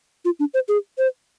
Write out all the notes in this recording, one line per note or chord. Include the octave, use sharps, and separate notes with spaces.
F4
D4
C5
G#4
C5